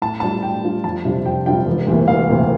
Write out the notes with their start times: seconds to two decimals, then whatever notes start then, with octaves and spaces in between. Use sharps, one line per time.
0.02 A2 A5
0.20 G3 D4 F4 A5
0.43 A2 G5
0.63 G3 D4 F4
0.84 F2 A5
1.05 C3 G3 D4 F4
1.25 F2 G5
1.46 C3 G3 D4 F4 G5
1.66 E1
1.87 D2 C3 E3 A#3
2.08 E1 F5
2.29 D2 C3 E3 A#3